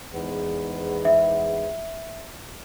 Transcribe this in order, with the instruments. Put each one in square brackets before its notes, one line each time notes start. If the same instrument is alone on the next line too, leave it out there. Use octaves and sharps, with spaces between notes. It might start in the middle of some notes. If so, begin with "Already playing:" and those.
[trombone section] E2 G#2 B3
[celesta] E5